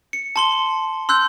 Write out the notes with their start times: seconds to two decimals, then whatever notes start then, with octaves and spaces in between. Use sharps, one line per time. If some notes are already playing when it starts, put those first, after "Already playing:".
0.13 C#7
0.36 A5 C6 G7
1.09 C6 E6 F#6 G6